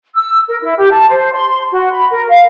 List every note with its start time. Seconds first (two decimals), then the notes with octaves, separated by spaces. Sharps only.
0.14 E6
0.47 A#4
0.61 E4
0.77 G4
0.91 A5
1.07 C5
1.34 C6
1.71 F#4
1.92 B5
2.11 A#4
2.29 F5